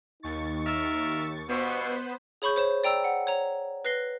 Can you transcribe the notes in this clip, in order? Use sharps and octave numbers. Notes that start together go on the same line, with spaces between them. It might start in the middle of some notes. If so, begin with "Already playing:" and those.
D#2 D#4 C#6 A6
A#4 E5
G2 B2 B3 B4 C5
G#4 C#5 B5 C#6 G6
C5 C#5 E7
D5 G5 A#5 E6
F#5
C#5 A#5
B4 F#6 A#6 C7 G7